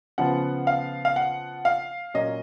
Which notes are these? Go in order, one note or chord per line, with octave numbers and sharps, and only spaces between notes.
C#3 F3 B3 F#5
F5
F5
F#5
F5
A#2 F#3 C#4 D#5